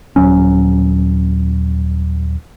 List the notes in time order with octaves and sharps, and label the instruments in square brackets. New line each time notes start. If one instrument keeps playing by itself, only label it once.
[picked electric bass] D#1 G#1 F#3 C#4